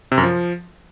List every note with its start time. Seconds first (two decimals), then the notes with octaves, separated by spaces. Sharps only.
0.12 C3
0.18 F#2
0.24 F3